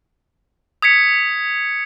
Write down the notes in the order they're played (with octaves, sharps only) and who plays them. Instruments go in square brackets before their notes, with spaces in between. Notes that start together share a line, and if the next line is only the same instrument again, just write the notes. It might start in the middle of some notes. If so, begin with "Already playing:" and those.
[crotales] D#6 G#6 B6 C#7